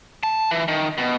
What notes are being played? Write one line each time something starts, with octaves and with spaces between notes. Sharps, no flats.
A5
E3
D#3
B2